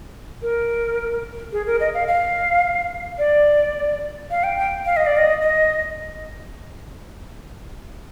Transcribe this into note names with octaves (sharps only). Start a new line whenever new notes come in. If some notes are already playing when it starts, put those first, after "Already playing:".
A#4
G#4
A#4
D#5
F5
F5
D5
F5
G5
G5
F5
D#5
D5
D#5
D#5